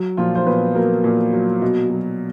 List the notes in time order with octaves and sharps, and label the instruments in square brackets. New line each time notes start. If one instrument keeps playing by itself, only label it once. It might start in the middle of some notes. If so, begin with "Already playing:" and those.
Already playing: [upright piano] F#3
A#2 F3 F4
C5
A#2 B3 B4
F#3 A#3 A#4
A#2
F#3
B2
F#3